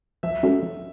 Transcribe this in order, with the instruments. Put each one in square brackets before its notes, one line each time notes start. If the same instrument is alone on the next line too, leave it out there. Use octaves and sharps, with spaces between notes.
[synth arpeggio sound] F3 [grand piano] E5
[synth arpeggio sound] G#3 C#4 F#4 A4
F3